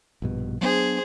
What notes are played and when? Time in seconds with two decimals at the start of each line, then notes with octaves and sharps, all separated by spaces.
0.22 A#1 G2 B2
0.61 F#3 B3 D4 G#4 C5